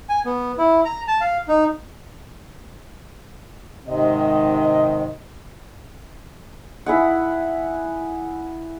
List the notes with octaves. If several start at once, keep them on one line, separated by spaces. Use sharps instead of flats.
G#5
B3
E4
A#5
A5
F5
D#4
G#2 C3 D#3 D#5
E4 G#4 F#5